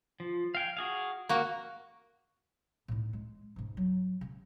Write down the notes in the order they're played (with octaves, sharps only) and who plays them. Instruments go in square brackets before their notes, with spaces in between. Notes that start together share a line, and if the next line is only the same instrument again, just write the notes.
[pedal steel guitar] F3
F5 G5 G#5
F#4 G#4 F5
[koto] A#3 F#4 [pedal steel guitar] A#4
[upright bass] A2 D#4
G#3
G#2 C#3
F#3
C#3